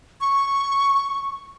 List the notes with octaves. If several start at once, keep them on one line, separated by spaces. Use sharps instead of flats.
C#6